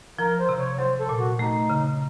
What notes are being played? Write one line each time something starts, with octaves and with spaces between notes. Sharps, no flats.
F3 A#4
C5
C3
C#5
F#3 C5
A4
A#2
F#4
A3 D#4
C#3